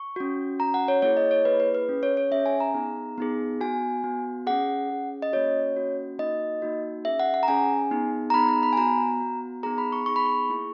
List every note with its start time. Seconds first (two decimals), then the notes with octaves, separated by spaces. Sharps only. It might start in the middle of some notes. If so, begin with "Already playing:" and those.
Already playing: C#6
0.16 C#4 F#4
0.59 C#4 F#4 A#5
0.74 F#5
0.88 C#5
1.02 A#3 E4 G#4 C#5
1.17 D#5
1.31 C#5
1.45 A#3 E4 G#4 B4
1.60 B4
1.75 B4
1.89 C#4 G#4
2.03 C#5
2.17 C#5
2.31 C#4 G#4 E5
2.46 G#5
2.60 A#5
2.74 B3 D#4 G#4
3.18 B3 D#4 G#4
3.61 B3 F#4 G#5
4.03 B3 F#4
4.47 C#4 G#4 F#5
4.90 C#4 G#4
5.22 D#5
5.33 A#3 C#4 F#4 C#5
5.76 A#3 C#4 F#4
6.19 A#3 D#4 F#4 D#5
6.62 A#3 D#4 F#4
7.05 C#4 G#4 E5
7.20 F#5
7.34 F#5
7.43 A#5
7.48 C#4 G#4 G#5
7.91 B3 D#4 G#4
8.30 A#5
8.34 B3 D#4 G#4 B5
8.49 A#5
8.63 B5
8.73 G#5
8.77 B3 F#4 A#5
9.20 B3 F#4
9.63 B3 D#4 G#4 A#5
9.78 B5
9.92 C#6
10.06 B3 D#4 G#4 C#6
10.16 B5
10.25 C#6
10.49 A#3 E4 G#4